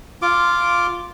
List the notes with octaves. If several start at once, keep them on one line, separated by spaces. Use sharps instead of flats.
F4 D6